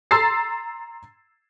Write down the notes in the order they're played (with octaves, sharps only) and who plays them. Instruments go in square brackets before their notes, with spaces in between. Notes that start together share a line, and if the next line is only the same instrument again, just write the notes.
[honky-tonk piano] A#5 C6 E6 A6 C7